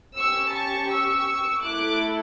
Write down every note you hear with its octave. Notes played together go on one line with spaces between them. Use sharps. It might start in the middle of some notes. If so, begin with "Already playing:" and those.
C#4 G4 C#6 E6
A5 C#6
C#6 E6
A3 E4 A4 D6 F#6